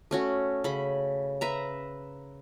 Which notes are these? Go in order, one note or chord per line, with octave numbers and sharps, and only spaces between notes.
A3 C#4 F#4
C#3 B5
B4 E5 A#5